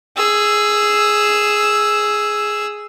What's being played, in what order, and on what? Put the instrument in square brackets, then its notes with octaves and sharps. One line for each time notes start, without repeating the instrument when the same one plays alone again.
[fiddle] G#4 E6